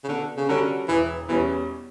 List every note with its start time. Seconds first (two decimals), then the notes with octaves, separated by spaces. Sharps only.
0.04 C#3
0.08 B2 D3
0.37 C#3
0.48 D3 G3 C#4 F#4 A#4
0.88 E1 E3
1.29 E2 B2 E3 G3 C#4